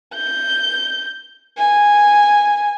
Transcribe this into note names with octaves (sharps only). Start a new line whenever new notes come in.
G6
G#5